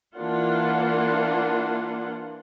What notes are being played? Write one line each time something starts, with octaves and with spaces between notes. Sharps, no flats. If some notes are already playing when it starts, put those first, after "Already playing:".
E3 A#3 D4 F4 F#5